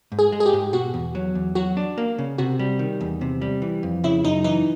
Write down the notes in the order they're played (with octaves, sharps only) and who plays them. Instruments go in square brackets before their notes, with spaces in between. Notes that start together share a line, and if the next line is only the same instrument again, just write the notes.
[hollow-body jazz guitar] G#2
[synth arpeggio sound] G#4
[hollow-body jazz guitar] G#3
[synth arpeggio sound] G#4
G4
[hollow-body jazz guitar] G#2
[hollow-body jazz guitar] B2 [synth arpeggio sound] F#4
[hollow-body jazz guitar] E2
F#3
E2
[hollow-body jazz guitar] F#3 [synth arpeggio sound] F#4
[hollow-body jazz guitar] D4
A#3
C#3
[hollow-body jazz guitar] C3 [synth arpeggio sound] F#4
[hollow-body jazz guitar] G3
D#3
E2
C3
G3
E3
F2
[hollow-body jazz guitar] C#3 [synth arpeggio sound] E4
[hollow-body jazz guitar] F#2 [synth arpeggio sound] D#4
[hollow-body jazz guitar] E3 [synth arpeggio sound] D#4